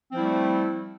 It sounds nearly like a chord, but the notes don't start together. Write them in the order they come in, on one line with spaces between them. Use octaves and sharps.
C4 F3 E4 G3 A3